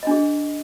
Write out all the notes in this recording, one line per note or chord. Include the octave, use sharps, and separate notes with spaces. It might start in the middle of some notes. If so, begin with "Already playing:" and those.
D4 G#4 D#5